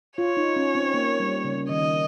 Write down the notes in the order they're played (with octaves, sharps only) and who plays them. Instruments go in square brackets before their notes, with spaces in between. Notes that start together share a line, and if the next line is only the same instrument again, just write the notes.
[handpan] F4 [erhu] C#5
[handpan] D#4
C#4
C4
A#3
G3
C#3
[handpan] D#3 [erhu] D#5